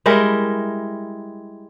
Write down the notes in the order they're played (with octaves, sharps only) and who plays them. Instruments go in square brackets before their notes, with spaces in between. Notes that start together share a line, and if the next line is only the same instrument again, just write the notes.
[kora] G3 G#3 E4 A#4